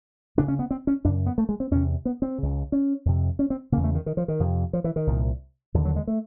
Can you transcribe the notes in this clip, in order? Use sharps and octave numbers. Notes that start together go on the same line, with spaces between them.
D2 C#3 D4
C#4
B3
C4
C#4
F#2 C#3 D4
B3
A3
G#3
C4
E2 C3 C#4
B3
C4
C#2 C#3
C#4
F2 C3
C#4
C4
E2 C#3 A#3
A3
D#3
D#3
F3
D#3
F2 C3
F3
E3
D#3
C2 A#2
D#2 D3 E3
F#3
G#3
A3